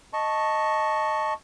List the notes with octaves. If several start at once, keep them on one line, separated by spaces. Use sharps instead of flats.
D#5 A5 C#6